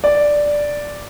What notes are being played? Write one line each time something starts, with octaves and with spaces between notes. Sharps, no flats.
D5